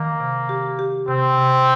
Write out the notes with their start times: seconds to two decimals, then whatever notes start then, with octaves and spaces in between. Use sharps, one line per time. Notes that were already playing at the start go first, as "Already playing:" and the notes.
Already playing: D#3 A#3
0.20 C3
0.49 G4
0.79 G4
1.08 C3 C4
1.38 C3